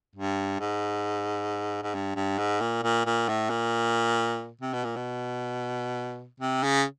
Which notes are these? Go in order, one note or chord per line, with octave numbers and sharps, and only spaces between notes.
G2
G#2
G#2
G2
G2
G#2
A#2
A#2
A#2
A2
A#2
C3
B2
A#2
B2
C3
C#3